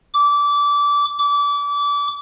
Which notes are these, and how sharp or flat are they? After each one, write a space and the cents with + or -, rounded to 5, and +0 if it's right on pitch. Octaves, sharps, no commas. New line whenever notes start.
D6 -20
D6 -30